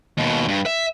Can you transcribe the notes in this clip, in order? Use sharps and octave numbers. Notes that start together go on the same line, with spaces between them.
D#2 B2
G2
E5